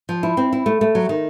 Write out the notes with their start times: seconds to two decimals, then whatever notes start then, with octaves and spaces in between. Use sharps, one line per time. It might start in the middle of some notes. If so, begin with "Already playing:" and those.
0.09 F3
0.23 E4
0.37 C4
0.53 E4
0.66 A3
0.81 A3
0.95 F#3
1.09 D#3